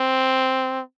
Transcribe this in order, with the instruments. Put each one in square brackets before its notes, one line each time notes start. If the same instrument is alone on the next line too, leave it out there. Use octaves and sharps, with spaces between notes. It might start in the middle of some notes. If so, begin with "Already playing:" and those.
Already playing: [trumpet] C4